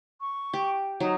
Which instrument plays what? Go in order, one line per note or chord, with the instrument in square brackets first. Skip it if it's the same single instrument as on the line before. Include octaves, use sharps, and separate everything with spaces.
[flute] C#6
[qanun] G4
[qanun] F#3 [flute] D#4